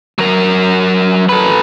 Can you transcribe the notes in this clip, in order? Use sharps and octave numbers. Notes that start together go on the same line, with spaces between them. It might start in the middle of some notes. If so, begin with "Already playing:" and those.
F#3 A#4
A4 B4